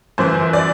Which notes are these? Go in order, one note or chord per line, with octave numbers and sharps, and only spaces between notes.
G1 F#2 E3 C5
D5